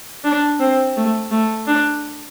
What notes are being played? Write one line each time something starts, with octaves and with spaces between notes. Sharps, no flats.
D4
C4
A3
A3
D4